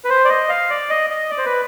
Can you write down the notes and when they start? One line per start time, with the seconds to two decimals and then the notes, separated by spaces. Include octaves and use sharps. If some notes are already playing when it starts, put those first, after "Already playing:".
0.04 B4
0.10 C5
0.25 D5
0.29 D#5
0.49 F5
0.70 D5
0.90 D#5
1.10 D#5
1.30 D5
1.38 C5
1.45 B4